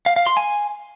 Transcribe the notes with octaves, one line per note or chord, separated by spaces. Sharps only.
F5
F5
C6
G#5